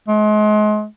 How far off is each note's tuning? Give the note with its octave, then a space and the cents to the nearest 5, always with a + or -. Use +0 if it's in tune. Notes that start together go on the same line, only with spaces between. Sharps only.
G#3 +35